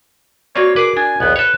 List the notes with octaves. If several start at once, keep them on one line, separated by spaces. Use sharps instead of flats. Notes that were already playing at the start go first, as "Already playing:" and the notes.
A#3 C4 F4 F#4 C#5 D5
G#4 A#4 B4 D6
D4 G#5
A#1 D#2 B3
A4 B4 C#5